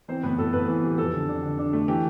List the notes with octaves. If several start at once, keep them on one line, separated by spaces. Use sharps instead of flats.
E3 C4 C5
A2 B3 B4
A2 A4
A2 B3 B4
E3
G3
F2 A4
D3
D4
D3
D4
A3
E3 G4